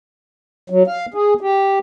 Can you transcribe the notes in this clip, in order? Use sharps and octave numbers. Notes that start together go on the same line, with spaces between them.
F#3
F5
G#4
G4